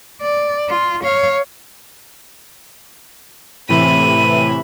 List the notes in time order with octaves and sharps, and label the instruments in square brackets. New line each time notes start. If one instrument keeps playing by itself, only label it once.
[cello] D5
F4
C#5 F5
[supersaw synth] A2 C3 E3 [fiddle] E5 B5 [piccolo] D#7